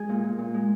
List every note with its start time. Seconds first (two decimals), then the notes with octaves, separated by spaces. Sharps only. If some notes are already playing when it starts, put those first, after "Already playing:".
Already playing: G#3 G#4
0.09 A#2
0.24 A#2
0.38 A#2
0.54 G#3